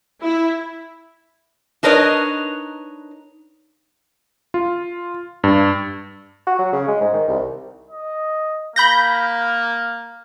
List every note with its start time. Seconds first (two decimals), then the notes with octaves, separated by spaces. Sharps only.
0.22 E4
1.83 D4 D#4 A#4 B4 C#5 D#5
4.54 F4
5.44 G2
6.47 F#4
6.59 F#3
6.72 C#3
6.88 G#3
7.01 G#2
7.14 D#3
7.28 C2
7.90 D#5
8.76 A#3 B5 G6 A#6